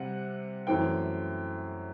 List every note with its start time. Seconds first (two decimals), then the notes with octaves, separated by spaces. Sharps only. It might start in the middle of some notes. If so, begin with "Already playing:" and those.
Already playing: C3 G3 C4 F#5
0.67 F#2 E3 A3 C4 G5